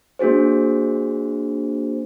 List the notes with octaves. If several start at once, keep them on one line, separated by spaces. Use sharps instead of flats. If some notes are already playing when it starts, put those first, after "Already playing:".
A#3 D4 F#4 G#4 C5